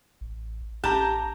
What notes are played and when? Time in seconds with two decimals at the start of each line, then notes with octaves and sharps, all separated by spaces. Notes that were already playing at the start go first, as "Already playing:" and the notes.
0.21 A1
0.84 A1 G4 A5 A#5 G6